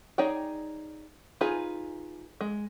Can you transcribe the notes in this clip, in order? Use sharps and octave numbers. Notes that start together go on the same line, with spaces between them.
D#4 G#4 C#5 D5 G5
D#4 F4 G#4 B4 G#5
G#3